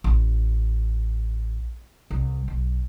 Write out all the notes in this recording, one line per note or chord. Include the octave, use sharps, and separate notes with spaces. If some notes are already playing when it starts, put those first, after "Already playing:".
A1
C2
B1